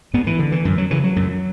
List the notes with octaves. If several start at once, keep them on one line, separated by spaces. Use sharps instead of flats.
G#2 B3
E3
D3
E3
F#2
F#3
C#3 E3
F#3
F#2